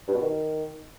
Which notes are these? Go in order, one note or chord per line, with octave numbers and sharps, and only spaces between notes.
G2
B2
D#3